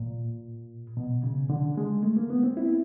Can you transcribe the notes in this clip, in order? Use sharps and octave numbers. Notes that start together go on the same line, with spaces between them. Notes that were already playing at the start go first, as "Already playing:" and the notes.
Already playing: A#2
B2
C#3
D3
G#3
A3
A#3
B3
C4
E4